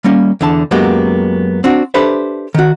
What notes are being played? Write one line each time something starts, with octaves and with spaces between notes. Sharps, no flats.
G3 A#3 C#4
E2 D3 A5
F#2 F#3 G#3 A#3 B3 G4
C4 D4 F#4
D4 G4 A4 B4 C5 E5
D#3 F#4